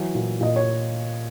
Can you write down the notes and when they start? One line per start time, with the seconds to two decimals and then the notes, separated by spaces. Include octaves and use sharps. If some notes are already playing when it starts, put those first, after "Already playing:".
Already playing: E3 F#3
0.15 A#2
0.41 A#2 D#5
0.56 C#5